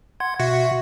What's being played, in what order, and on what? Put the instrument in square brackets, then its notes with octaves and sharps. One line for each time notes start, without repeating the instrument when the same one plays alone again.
[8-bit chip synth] F#5 C6 G#6
[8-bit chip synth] B2 E5 [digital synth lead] F#4